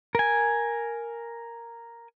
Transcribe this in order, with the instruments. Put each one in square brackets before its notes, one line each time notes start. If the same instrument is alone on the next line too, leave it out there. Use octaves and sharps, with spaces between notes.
[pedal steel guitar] A#4 G#5